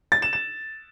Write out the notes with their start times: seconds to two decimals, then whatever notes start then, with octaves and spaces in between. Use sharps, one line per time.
0.12 A6
0.22 E7
0.33 E7